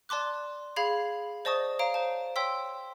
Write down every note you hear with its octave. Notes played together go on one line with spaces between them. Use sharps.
D5 A5 C6 D6 F#6
G#4 F5 B5 G#6 C7 F7
C5 D5 D#5 A5 C#6 D#6
C#5 F5 A#5 D7
C5 A5
C#5 G5 C6 E6 B6